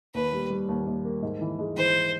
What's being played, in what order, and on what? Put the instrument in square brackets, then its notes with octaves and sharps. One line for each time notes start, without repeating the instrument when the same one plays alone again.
[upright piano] D#2 [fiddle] B4
[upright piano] G3
G3
D#2
D#2
A#3
G#2
E3
G#3
[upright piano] E3 [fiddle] C5